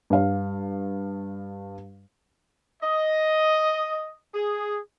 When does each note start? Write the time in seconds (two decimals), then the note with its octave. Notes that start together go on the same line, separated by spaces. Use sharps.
0.10 G2 F5
2.83 D#5
4.34 G#4